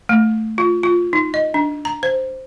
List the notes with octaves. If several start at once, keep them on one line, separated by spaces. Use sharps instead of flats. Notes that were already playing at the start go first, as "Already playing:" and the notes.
A3
F4
F4
D#4
D#5
D4
A#5
C5